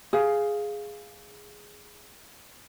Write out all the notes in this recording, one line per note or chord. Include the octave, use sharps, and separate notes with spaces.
G#4 F5